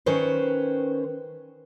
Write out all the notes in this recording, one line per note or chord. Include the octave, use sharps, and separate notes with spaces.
D#3 C#4 B4 C5